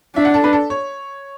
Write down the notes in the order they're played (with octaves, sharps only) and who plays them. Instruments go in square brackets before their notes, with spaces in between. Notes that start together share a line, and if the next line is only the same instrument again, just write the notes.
[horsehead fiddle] D4 [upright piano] E5
[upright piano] F#5
A4
B4
A4
C#5